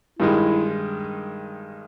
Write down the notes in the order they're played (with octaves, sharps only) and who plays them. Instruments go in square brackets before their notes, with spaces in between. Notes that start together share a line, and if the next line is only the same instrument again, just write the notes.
[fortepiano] G2 D#3 G#3 [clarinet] E4